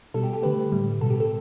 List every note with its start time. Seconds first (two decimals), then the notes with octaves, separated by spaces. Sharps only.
0.14 B2 G3 A4
0.23 G4
0.33 G4
0.42 D3 A3 B4
0.72 A2 G3
1.01 B2 G3 A4
1.10 G4
1.20 A4